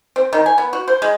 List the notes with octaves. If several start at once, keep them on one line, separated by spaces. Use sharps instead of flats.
C4
D#3
G#5
B3
F#4
C5
G#3